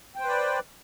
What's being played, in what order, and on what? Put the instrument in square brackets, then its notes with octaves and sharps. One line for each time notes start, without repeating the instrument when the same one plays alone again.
[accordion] G5
C5
B4
D5